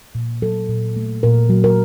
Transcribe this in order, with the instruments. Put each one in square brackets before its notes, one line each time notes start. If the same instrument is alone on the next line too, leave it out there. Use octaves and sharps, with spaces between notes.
[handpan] A#2
F#3 A4
A#2
A3
A#2 A#4
F#3
A#4